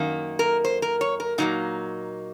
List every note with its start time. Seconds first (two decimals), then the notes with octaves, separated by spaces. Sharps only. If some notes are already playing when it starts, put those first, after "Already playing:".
Already playing: F#2 D#3 A#3
0.39 A#4
0.64 C5
0.82 A#4
1.01 C#5
1.20 A#4
1.38 A#2 F#3 A#3 D#4